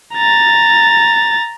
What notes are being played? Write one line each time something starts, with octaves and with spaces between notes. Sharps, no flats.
A#5 A6